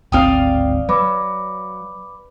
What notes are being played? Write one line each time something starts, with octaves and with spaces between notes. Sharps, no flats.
D1 G#1 C4 D5 F5 G5 D#6 F6
F#3 B4 B5 D6